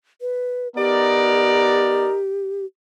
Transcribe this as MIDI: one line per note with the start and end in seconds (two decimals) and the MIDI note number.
0.21 0.68 71
0.76 2.08 59
0.76 2.16 63
0.76 2.65 67
0.76 2.16 70
0.76 2.08 74